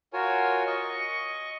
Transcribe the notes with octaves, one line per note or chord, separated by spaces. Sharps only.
F4 F#4 A#4 C#5 G#5
D#5 C#6